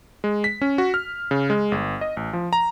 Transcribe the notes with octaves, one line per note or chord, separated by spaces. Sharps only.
G#3
B6
C#4
F#4
F6
C#3
G#3
G1
D#5
A1
F3
A#5